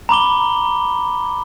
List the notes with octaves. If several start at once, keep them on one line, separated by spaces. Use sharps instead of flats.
A#5 B5 D6 G7